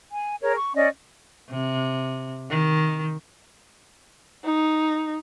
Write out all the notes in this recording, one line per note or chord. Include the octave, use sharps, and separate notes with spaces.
G#5
G#4 A#4 C#5
C#6
C#4 D5 D#5
C3
D#3
D#4